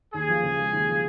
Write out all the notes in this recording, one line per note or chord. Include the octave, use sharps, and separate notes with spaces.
D#2 G#4
F3
C#3
G#3
D#2
F3